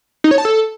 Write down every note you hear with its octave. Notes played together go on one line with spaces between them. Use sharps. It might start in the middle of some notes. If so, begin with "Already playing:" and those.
D#4
C#5
A5
A4